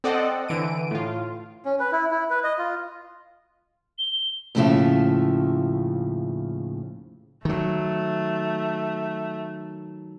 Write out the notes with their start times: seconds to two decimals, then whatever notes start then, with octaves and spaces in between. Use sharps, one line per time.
0.04 C4 A4 D5 D#5 F#5
0.48 D3 E3 D7 D#7
0.91 A2 F4
1.65 C#4
1.80 B4
1.92 E4
2.11 E4
2.30 B4
2.44 D#5
2.59 F4
3.99 G7
4.55 D#2 A2 C#3 F3 E5 F5
7.45 D#3 F#3 A3